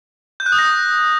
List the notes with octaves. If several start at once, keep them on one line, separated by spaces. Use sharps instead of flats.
G6
F#6
D#6
A#6